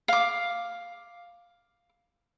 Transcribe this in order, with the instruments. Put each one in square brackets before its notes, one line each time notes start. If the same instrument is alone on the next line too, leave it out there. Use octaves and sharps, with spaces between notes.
[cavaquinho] F5 D6